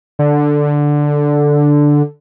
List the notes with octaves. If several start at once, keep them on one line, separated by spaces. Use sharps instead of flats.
D3